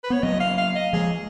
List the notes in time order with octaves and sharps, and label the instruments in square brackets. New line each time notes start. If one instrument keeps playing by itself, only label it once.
[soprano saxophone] B4
[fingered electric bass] B3 [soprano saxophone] C#5
[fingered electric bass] F#3 A#3 [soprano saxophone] D#5
[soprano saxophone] F5
F5
D#5
[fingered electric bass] F3 G#3 [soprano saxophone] G#4